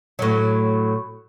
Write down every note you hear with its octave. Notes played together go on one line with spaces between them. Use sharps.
A2 F#3